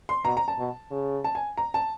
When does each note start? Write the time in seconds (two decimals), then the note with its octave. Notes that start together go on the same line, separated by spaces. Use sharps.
0.09 C6
0.25 B2 A#5
0.37 A#5
0.48 A5
0.59 B2
0.91 C#3
1.24 A5
1.35 G#5
1.57 A#5
1.74 A5